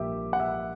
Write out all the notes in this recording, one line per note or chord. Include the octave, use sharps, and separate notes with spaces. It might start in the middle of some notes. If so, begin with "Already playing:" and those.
Already playing: A#1 A#2 G3 A#3 G4 E5
F#5
E5